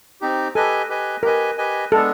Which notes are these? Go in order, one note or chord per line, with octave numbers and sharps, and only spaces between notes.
C4 D#4 G4
G4 A4 B4 D#5 G#5
G4 B4 D#5 G#5
G4 A#4 B4 D#5 G#5
G4 B4 D#5 G#5
G#3 B3 D4 A4